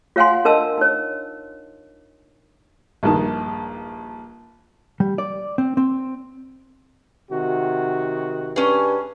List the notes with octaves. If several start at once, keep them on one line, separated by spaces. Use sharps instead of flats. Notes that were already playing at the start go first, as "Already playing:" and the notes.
F4 C#5 F5 F#5 G#5 C6
D4 A#4 D#5 A5 E6
D#4 C#5
A#1 G2 D#3 A5
G3
D5
C4
C4
C3 D#3 F#4
G2 C#4 G#4